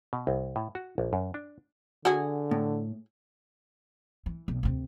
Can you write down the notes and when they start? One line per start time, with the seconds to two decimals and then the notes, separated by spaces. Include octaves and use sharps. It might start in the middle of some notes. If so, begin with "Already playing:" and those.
0.13 B2
0.27 C2
0.56 A2
0.75 F#4
0.98 A#1
1.13 F#2
1.34 D4
2.05 D3 F#4 G#4
2.51 A2
4.26 E3
4.48 B1
4.63 D2 C3